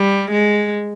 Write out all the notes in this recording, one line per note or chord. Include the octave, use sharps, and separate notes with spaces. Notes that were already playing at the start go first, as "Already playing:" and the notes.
Already playing: G3
G#3